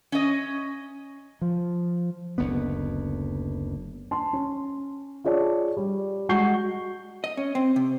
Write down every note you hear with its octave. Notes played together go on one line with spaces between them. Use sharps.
C#4 D#5
F3
F#1 D2 B3
A5 C6
C#4
F4 G#4 C#5 D5 A5
G3
G#3 F#4 C#6 G6 C7 G7
D#5
C#4
C4
C3